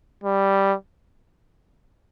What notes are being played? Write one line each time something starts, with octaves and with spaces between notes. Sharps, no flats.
G3